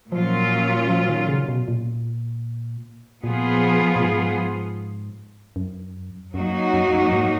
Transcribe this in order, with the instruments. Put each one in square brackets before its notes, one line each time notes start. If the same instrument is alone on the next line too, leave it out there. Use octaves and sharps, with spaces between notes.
[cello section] A#2 F#3 A#3 C#4 F4 [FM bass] F3
[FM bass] F3
D#3
C#3
B2
A#2
[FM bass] A#2 [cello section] F3 B3 F4 G#4
[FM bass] A#2
G#2
F#2
[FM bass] F#2 [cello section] F#3 A#3 D#4 F#4
[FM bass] F#2
F#2
G#2